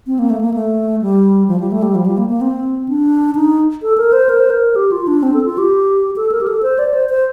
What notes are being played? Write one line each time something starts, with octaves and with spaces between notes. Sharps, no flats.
C4
A#3
A3
A#3
A3
G3
F3
G3
A3
G3
F3
G3
A#3
A#3
C4
D4
D#4
A4
A#4
C5
A#4
C5
A#4
G4
F4
D4
C4
A4
F4
G4
A4
A#4
G4
A4
C5
D5
C5
C5